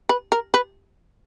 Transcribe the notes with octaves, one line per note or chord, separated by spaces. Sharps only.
B4
A#4
B4